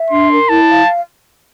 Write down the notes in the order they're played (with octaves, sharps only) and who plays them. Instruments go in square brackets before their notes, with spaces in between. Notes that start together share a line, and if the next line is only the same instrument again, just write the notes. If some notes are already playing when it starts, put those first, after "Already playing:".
Already playing: [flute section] E5
[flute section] D4 [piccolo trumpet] C6
[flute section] A#4
[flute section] E4 [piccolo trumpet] A5
[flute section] F5